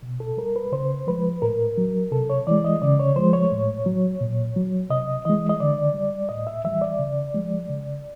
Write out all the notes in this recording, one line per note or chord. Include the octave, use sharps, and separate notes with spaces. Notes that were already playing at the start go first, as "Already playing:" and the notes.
B2
A4
G3 A#4
B4
C#3 C5
F3 G#3 B4
A2 A#4
F#3
C3 A4
C#5
E3 G#3 D5
D#5
C#3 D5
C#5
F3 G#3 C5
C#5
A2
F#3
A#2
F#3
C3 D#5
E3 G#3 D#5
D#5
D3 D5
G3
A2 D#5
E5
E3 G3 E5
D5
C#3
F3 G#3
C#3